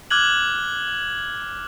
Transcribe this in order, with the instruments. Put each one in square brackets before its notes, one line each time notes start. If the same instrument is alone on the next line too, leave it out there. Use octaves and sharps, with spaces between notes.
[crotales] D6 F6 F#6 G#6 F#7